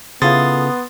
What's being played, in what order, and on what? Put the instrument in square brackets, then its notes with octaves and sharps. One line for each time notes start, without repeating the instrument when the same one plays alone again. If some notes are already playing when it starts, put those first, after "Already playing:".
[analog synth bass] C#3 [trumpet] B3 [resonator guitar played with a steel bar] E4 F4 A4 [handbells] C6 D#6 A6